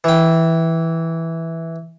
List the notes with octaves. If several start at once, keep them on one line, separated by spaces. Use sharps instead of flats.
E3 G5